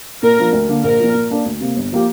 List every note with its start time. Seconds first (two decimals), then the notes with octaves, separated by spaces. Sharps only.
0.22 A#2 A#4
0.38 F3 A#3 D4
0.53 D2
0.69 D3 A#3 D4
0.84 A#1 A#4
1.00 A#2 F3
1.14 A#2
1.30 A#3 D4 A#4
1.45 D2
1.61 C3 A#3
1.76 G1
1.92 F3 A#3 G4